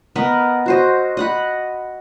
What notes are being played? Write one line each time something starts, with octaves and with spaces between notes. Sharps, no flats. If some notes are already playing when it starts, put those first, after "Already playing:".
B3 A#4 D#5 B5
F#4 C5 D#5
D#5 F#5 B5